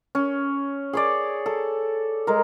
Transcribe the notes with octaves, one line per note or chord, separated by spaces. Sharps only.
C#4
G#4 C#5 D5
A4
G#3 A#4